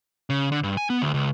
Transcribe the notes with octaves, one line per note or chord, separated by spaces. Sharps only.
C#3
D3
G2
G#5
B3
D2
C#2